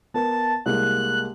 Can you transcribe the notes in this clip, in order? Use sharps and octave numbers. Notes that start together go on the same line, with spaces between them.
B3 A#4 A5
A5
C2 G#3 A#3 F#6